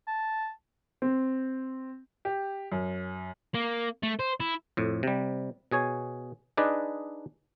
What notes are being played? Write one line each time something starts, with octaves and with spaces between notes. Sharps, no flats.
A5
C4
G4
F#2
A#3
A3
C5
E4
F2 A2
C3 G3
B2 G#4 C#5 G#5
D4 D#4 G#4 B4 D5 D#5